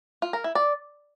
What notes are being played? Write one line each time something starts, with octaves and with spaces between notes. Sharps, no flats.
F4
A#4
E4
D5